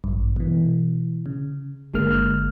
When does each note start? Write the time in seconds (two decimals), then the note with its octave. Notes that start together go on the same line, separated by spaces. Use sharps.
0.04 A1 G2
0.36 B2 E3
1.26 C#3
1.94 G1 D3 G#3 A#3 F6